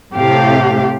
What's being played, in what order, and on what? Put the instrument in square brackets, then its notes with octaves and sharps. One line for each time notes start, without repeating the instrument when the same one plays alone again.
[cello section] A2 C3 G4 F5